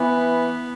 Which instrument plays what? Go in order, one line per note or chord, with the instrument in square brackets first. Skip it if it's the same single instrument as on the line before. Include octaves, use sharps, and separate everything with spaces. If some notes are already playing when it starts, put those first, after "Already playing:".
Already playing: [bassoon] E3 [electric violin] B3